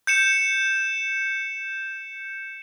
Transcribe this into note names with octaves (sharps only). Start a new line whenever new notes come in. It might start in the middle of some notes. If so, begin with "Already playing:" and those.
G6 C#7 E7